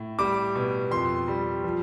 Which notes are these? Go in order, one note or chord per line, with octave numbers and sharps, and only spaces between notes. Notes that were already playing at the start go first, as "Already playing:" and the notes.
Already playing: A2
G3 D6
B2
F2 C6
G3
F3